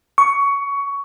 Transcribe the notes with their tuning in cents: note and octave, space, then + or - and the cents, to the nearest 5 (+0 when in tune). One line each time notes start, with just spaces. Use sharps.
C#6 +15